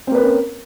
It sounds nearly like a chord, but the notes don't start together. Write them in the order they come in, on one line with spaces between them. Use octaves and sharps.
C4 A#3 B4 A#4 C#4